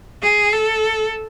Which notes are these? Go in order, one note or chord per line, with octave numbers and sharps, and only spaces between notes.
G#4
A4